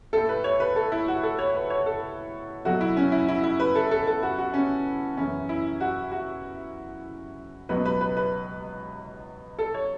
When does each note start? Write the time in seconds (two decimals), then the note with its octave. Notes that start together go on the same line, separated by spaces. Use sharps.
0.13 A2 A3 A4
0.29 B4
0.44 C#5
0.60 B4
0.76 A4
0.92 E4
1.08 F#4
1.23 A4
1.39 C#5
1.55 B4
1.70 C#5
1.86 A4
2.65 B2 F#3 A3 F#4
2.81 E4
2.97 C#4
3.12 E4
3.28 E4
3.44 E4
3.60 B4
3.75 A4
3.91 A4
4.07 A4
4.23 F#4
4.38 F#4
4.54 C#4
5.17 F#2 C#3 E3 B3 C#4
5.49 E4
5.81 F#4
6.11 F#4
7.69 C#2 B2 F#3 B3 B4
7.85 B4
8.01 B4
8.17 B4
9.59 A4
9.74 C#5